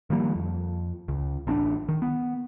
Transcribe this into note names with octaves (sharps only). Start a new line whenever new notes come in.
D#3 F3 G3 A#3
F2
C#2
A1 C4 D4
D#3
B3